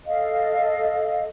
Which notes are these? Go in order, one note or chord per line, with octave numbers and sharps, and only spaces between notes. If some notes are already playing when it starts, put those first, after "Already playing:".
A4 D#5 F5